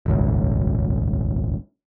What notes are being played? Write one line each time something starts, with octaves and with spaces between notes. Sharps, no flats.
D#1 G#1 C#2